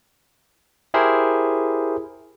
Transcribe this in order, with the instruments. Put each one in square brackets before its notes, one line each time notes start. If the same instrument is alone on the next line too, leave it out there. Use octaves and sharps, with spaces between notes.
[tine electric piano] E4 G4 G#4 A#4 C5